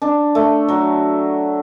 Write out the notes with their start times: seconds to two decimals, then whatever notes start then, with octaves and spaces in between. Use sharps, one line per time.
0.02 D4
0.35 A3
0.68 F#3